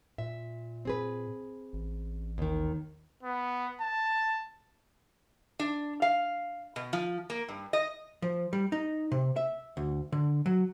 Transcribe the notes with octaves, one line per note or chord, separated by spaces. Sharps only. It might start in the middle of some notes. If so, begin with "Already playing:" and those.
A#2 E5
C4 G#4 B4
A1
D#2 D#3
B3
A5
D4
F5
B2
F3
A#3
G2
D#5
F3
G3
D#4
C3
E5
D2
D3
F#3